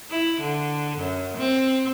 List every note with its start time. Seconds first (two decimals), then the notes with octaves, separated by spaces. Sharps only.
0.11 E4
0.41 D3
0.98 F#2
1.38 C4